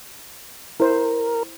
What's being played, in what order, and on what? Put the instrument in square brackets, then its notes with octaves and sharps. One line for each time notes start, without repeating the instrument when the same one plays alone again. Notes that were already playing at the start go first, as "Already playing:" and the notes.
[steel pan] E4 C5 [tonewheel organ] A#4